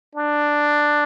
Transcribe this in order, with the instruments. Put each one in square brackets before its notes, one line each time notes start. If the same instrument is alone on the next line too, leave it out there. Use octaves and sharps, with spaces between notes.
[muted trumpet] D4